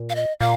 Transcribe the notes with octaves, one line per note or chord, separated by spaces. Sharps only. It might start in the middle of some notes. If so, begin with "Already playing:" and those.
Already playing: A#2
F5
D#5
A#2 F5